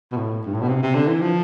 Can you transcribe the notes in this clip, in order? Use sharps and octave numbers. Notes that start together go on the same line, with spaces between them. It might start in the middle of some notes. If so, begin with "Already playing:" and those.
B2
A2
G2
A2
B2
C3
C3
D3
E3
F3